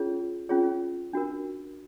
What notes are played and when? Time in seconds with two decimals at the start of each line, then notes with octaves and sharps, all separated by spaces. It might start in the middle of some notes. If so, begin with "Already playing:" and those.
Already playing: C#4 F4 G#4 C#5
0.49 C#4 F4 G#4 C#5
1.13 D4 F#4 A#4